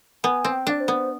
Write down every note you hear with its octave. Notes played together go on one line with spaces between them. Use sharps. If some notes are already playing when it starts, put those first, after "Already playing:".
B3 G#5
C4
G5
D4 D5
C5
B3